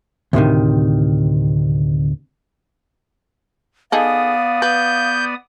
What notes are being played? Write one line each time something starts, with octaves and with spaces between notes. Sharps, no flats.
D2 A2 C3 D#3
B3 D#4 G#4 A4 D5 F5 D#6
B4 G6